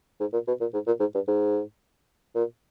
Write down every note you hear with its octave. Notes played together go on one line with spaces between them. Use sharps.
G#2
A#2
B2
A#2
G#2
A#2
G#2
G2
G#2
A#2